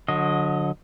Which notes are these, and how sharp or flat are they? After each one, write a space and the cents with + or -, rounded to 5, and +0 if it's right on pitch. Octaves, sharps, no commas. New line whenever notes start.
D3 +0 F#3 -30 D#5 +0